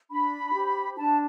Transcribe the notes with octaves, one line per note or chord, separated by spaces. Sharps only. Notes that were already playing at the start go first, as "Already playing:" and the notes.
D4 B5
G4 C5
D4 A5